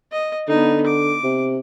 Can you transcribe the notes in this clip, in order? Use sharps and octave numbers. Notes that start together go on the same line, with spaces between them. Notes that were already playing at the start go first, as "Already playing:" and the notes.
D#5
D3 B3 D#4
D6
C3